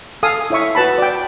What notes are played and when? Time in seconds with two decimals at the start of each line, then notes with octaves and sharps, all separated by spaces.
0.23 A4 F5 G#5 D#6
0.50 E4 C#5 E5 C#6
0.75 F#4 B4 A5 B5
0.98 D5 G5